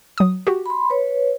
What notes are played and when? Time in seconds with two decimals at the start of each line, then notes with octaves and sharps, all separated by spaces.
0.18 F#3 D#6
0.47 F#4 G4
0.66 B5 C6
0.90 B4 C#5